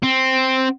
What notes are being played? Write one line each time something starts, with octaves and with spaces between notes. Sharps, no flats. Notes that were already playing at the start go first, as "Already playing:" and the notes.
C4